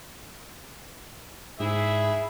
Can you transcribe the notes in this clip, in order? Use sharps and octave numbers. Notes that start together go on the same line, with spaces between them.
G#2 E4 G#4 E5